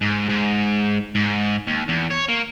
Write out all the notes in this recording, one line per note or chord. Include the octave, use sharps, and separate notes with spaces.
G#2
G#2
G#2
D#2
E2
C#5
A#3